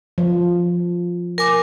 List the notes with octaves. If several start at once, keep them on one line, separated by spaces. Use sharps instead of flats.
F3
A#4 G#5 D6